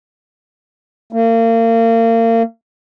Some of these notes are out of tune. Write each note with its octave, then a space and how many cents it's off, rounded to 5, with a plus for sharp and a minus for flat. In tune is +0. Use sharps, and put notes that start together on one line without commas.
A#3 -35